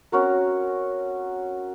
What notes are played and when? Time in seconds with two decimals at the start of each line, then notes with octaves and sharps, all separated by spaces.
0.12 C4 C#4 F#4 A#4